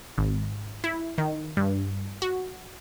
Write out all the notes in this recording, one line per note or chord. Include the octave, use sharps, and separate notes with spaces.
G#1
E4
D#3
G2
F#4